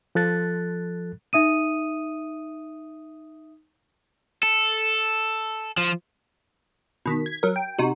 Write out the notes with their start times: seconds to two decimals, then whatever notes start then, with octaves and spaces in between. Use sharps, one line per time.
0.15 F3 A4 F#6 A6
1.33 D#4 E5 D#6 D#7
4.43 A4
5.77 F3
7.06 B2 D#3 B6
7.26 G#6 B6
7.43 F#3 A#4
7.56 G5
7.79 C3 D#4 F#4